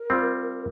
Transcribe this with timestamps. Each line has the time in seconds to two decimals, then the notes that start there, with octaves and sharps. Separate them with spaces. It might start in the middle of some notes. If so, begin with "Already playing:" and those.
Already playing: A#4
0.10 G3 C4 F4